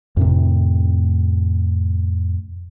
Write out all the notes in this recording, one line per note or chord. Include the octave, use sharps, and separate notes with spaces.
F2 A2 C3